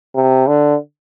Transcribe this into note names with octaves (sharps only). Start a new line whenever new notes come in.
C3
D3